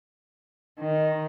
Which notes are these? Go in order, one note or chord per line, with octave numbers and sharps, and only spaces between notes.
D#3